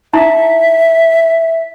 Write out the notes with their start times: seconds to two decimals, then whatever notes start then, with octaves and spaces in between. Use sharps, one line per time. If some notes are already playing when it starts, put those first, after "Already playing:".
0.13 D#4 E4 E5 A#5